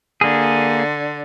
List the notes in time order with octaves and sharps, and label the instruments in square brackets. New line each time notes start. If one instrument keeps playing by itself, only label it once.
[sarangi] D3 [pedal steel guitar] A#3 G#4